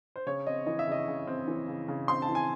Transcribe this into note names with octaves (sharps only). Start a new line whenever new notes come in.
C5
C#3 C#5
C4 D#5
E3 D#5
E5
C#3 D#5
C#3
C4
E3
C#3
C#3
C4 C6
A5
E3
G#5